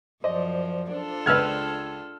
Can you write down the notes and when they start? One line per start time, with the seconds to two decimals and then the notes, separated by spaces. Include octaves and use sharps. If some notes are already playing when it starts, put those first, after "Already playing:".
0.24 F#2 F3 C5 D5 D#5
0.92 D4 F4 A4
1.26 C#2 B4 E6 F6 G#6